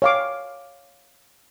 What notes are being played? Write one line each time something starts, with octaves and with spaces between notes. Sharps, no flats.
C#5 F5 D6